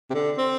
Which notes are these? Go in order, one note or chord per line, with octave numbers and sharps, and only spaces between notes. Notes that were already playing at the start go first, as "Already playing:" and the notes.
C3
D3
C4